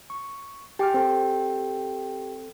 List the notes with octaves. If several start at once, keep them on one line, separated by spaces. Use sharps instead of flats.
C#6
G4 G5 G#5 D6 F6
C4 A4